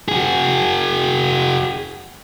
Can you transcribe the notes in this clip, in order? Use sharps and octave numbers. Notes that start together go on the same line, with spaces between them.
F#4 G#4